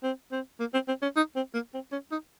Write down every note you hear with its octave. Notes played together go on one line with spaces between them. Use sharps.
C4
C4
A#3
C4
C4
C#4
D#4
C4
A#3
C4
C#4
D#4